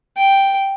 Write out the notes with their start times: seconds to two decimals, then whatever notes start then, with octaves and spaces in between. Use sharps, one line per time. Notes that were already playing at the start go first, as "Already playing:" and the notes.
0.17 G5